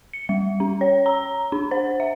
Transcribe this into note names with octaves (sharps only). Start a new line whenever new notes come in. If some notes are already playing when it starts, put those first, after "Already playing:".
C#7
G3
C#4
C#5
A#5
D4
C5
E5